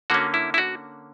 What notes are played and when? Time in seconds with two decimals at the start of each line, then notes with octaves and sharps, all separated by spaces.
0.10 D3 A#3 C#4 F#4
0.34 E4
0.54 E4
0.58 F#4